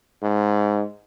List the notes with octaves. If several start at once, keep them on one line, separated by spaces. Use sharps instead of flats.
G#2